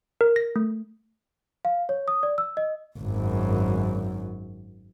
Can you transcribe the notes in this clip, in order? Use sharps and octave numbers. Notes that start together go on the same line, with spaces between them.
A#4
A#6
A3
F5
C#5
D#6
D5
E6
D#5
G#1 F#2